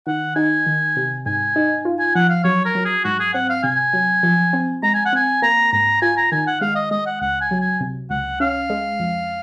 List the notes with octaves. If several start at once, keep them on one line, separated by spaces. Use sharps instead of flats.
D#3 F#5
D#4 G#5
D#3
C3
G#2 G#5
D#4
F4
G#5
F3 F#5
F5
F#3 C#5
A#4
F#3
G#4
G#2 F#4
G#4
C4 F#5
F5
C3 G#5
F#3
F3
C4
G#3 A#5
G#5
F#5
C4 G#5
A#3 A#5
G#2 A#5
F4 G#5
A#5
D#3 G#5
F#5
G#3 F5
D#5
G#3 D#5
F#5
C#2 F#5
G#5
F#3
G#5
C3
C#2 F#5
C#4 F5
G#3
F2